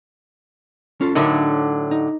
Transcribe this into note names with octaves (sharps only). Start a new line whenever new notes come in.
C#4 F4 A4
A2 D3 F#3 D#4 A#4 E5
D#4